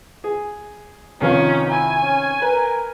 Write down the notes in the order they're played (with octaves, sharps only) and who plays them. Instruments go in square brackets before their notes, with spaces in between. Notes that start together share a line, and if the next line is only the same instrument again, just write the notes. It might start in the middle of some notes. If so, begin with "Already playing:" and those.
[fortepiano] G#4
[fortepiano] C2 D#3 F3 [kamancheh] C#4 [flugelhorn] D#4
[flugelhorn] E4 [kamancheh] G#5
[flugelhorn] C#4
[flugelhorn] A#4 [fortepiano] B4